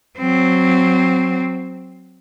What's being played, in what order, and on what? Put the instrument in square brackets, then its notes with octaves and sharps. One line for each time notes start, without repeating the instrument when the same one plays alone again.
[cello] F#3 C4